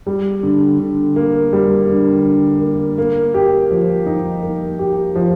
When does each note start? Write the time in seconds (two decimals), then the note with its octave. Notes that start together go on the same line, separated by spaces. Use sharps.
0.07 G3
0.43 D3
0.79 D3
1.16 A#3
1.53 G3
1.89 D3
2.24 D3
2.61 A#3
2.98 A#3
3.34 G4
3.71 F3
4.06 D#4
4.43 A#3
4.79 G4
5.15 F3